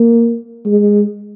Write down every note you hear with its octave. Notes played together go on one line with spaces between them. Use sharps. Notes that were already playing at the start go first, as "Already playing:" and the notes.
Already playing: A#3
G#3